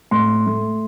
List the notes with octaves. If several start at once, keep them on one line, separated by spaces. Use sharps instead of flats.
A2 C6
A3